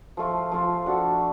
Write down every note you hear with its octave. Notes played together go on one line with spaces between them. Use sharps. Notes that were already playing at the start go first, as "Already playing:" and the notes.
F3 A3 F4
F3 A3 F4
D4 F#4 A4